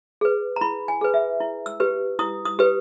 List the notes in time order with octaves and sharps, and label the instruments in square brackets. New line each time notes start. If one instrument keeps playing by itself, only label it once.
[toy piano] G#4 B4
A#5
E4 B5
G#5
G#4 B4
E5
E4
E6
G4 B4
E4 D#6
D#6
G4 B4